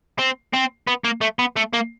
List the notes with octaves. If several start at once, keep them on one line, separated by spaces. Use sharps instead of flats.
C4
C4
B3
A#3
A3
B3
A3
A#3